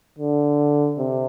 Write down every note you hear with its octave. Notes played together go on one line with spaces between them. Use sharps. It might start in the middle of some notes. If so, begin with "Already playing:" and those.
D3
C3